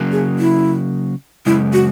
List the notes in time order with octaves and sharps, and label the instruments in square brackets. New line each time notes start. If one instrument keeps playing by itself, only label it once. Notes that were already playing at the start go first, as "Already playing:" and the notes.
Already playing: [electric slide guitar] C#3 F#3 A#3
[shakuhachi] G#4
E4
[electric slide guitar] F#2 C#3 G#3 [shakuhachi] E4
[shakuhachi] F#4